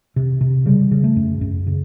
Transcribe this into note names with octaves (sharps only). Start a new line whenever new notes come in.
C3
C3
C#3 G3
C#3
A3
F#2
F#2
C#3